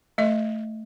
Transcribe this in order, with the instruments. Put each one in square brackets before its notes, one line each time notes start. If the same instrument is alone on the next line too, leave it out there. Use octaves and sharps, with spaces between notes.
[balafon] A3 D#5